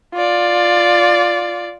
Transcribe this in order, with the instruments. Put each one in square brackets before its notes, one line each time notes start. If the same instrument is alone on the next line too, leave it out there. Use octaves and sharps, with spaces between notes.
[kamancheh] F4 D5